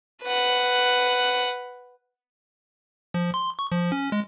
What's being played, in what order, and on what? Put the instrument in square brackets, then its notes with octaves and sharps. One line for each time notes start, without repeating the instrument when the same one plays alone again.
[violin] B4 F#5
[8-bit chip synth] F3
C6
C#6
F3
C#4
G#3